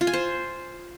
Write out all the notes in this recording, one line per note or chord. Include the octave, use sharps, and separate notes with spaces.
F4
G#5
C5